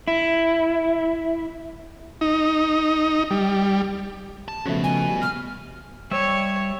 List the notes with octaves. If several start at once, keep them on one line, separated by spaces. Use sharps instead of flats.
E4
D#4
G3
A5
C#3 F3 A3 B3 F#4
G#5
G3
F6
G3 C#5 E5